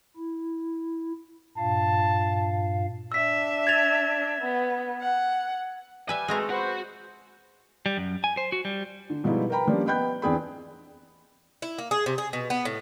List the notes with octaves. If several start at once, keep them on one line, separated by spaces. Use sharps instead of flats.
E4
G2 A#2 F5 A5
D4 E5 E6 B6
G#6 A6 F7
B3
F#5
G3 B4 E5 G#5
B2 G#3 A3 C4 A#5
B3 F#4 B4 C5
G3
F#2
G#5
C5
F#4
G3
D3
B2 F3 G3 G#3 D#4 E4
A#4 B4 G5 A#5 B5
F3 G3 A#3 C#4 D4
B3 D#5 G5 B5 F#6 G6
E2 C4 D4 G#4 G5 B5
E4
A#3
G#4
C3
G#4
B2
B3
A2